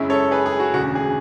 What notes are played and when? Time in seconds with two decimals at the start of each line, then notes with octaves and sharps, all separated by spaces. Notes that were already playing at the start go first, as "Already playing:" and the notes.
Already playing: F#2 C#3 G#3 C#4 E4
0.10 A4 C#5
0.31 G#4 B4
0.46 G#4
0.60 F#4
0.74 E1 D2 C#3 F#4
0.95 G#4